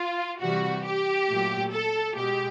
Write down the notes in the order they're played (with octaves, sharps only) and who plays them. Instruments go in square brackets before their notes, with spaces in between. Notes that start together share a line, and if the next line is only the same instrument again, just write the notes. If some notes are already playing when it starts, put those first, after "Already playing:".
Already playing: [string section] F4
C3 E3 G3 F#4
G4
A#2 F#3 A3
A4
B2 G#3 G4